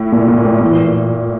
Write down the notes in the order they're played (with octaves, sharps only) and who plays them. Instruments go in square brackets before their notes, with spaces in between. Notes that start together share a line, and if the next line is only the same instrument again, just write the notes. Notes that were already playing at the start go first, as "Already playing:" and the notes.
Already playing: [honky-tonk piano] A2
[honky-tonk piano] A#2 [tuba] A#3
[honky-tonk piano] A#2
A2
[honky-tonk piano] A#2 [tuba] E3